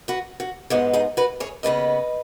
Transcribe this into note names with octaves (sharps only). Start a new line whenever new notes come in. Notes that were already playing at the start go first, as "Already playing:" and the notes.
F#4 B4
F#4
G#2 G#3 B3 F#4
D#4 G#4
F#4 B4
G#4 C#5
D#2 C#3 B3 B4 D#5